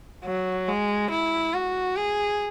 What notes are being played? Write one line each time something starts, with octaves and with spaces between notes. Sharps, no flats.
F#3
G#3
E4
F#4
G#4